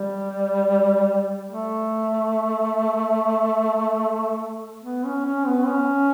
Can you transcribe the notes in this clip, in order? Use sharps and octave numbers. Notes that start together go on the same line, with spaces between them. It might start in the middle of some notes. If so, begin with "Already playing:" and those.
Already playing: G3
A3
B3
C#4
C#4
B3
C#4